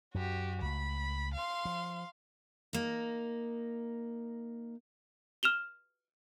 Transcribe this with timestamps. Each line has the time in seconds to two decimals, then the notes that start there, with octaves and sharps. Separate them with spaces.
0.14 F#2 F#4 G4
0.61 C#2 A3 B5
1.34 F5 C6
1.65 F3
2.73 A#3 D#4
5.43 F6 E7 F7 G7